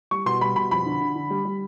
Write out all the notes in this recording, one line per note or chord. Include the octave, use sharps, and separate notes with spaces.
G3 C#6
B2 C6
G3 B5
B2 B5
F2 B5
D3
D3
D3
G3
G3